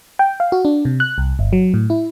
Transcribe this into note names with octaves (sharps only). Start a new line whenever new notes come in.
G5
F5
F#4
D4
C3
F#6
C2
G1
F#3
A2
E4